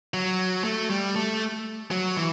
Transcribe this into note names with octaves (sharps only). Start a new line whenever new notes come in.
F#3
A3
G3
A3
F#3
E3